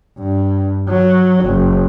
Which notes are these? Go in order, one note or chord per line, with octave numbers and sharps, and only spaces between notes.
G2
F#3
F#1